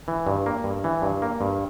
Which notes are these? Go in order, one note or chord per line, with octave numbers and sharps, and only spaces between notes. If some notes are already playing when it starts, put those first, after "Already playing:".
E3
G2
A#3
G2
E3
G2
A#3
G2